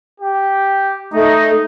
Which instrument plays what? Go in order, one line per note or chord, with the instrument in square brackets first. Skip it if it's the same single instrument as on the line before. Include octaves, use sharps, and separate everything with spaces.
[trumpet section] G4
[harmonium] A3 [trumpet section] D#4